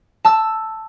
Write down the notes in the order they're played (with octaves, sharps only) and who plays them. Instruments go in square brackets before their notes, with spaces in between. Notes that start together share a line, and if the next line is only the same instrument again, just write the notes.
[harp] A5 E6